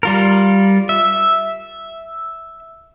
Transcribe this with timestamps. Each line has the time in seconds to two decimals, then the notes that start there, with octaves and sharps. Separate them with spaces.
0.03 G3 F4 A#4
0.89 E5